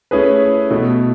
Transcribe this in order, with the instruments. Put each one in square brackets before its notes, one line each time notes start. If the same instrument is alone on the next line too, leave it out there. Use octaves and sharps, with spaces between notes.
[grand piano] A3 C#4 E4 G#4 B4
B2 A3 E4